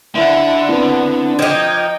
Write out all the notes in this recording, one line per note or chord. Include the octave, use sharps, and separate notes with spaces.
D3 E4 F#5
B3 C4 D4 E4
F3 D#4 D#5 G5 D6 D#6 G#6